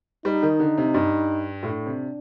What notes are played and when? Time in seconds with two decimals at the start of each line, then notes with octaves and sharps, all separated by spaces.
0.25 G3 D#4
0.43 D#3
0.60 D3
0.78 C3
0.94 G2
1.63 A2 D4
1.86 C3